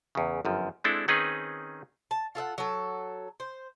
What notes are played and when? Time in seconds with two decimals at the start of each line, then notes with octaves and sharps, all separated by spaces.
0.15 E2 C#3
0.45 G1 F#2 F3
0.84 G#3 C4 D4 E4 A4
1.08 D#3 C4 C#4 D#4 G#4 B4
2.11 A5
2.35 F4 A4 E5 F#5
2.58 F#3 A4
3.40 C5